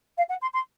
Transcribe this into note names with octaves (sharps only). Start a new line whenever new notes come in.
F5
F#5
C6
C6